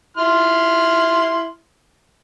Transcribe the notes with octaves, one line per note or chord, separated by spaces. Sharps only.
E4 C6 F6